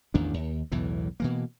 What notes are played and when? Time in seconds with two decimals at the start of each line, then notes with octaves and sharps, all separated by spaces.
0.14 A1 E2 D#3 D4
0.34 D#2
0.72 B1 E2 A2 E3
1.20 B2 E3 A#3